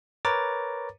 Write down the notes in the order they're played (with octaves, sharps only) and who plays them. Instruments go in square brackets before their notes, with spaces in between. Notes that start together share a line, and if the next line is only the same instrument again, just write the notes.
[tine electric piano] A#4 B4 C#5 A#5 D6 A6